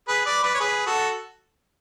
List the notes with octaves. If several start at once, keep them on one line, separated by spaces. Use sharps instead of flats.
G#4 B4
B4 D5
B4 D5
C#5
G#4 B4
F#4 A4